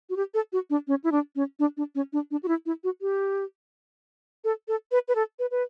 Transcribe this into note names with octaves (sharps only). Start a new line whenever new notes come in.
F#4
G4
A4
F#4
D4
C#4
E4
D4
C#4
D4
D4
C#4
D4
D4
F#4
E4
E4
F#4
G4
A4
A4
B4
B4
A4
B4
B4